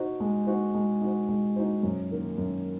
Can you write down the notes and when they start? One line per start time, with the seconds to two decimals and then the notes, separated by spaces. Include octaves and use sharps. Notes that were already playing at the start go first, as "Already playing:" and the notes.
Already playing: D#4 F#4 C5
0.20 G#3
0.47 D#4 F#4 C5
0.75 G#3
1.01 D#4 F#4 C5
1.29 G#3
1.56 D#4 F#4 C5
1.83 F#2
2.11 D#3 A#3
2.38 F#2